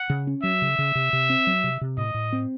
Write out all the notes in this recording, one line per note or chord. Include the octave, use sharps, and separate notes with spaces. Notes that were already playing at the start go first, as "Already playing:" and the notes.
Already playing: F#5
C#3
C#4
F#3 E5
C#3
C#3
C3
C3
C4
F#3
C3
C3
A2 D#5
A2
C4